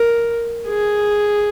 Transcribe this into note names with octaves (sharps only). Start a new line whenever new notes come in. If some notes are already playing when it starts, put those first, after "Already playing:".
Already playing: A#4
G#4